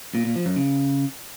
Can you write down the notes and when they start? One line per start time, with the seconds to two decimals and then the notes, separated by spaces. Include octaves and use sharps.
0.15 A#2
0.25 A#2
0.35 F3
0.46 F#2
0.56 C#3